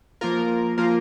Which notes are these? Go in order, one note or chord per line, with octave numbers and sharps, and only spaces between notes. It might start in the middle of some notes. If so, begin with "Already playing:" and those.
F3 A#3 F4 A#4
F3 A#3 F4 A#4